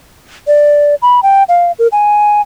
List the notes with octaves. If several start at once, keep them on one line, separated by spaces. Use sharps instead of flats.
D5
B5
G5
F5
A#4
G#5